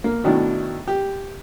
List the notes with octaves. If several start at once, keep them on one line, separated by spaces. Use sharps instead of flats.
A#3
B2 D#3 F#3 A3 D4 E4
G4